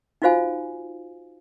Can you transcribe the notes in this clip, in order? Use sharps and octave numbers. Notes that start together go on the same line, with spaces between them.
D#4 F4 F#4 C5 F5 G#5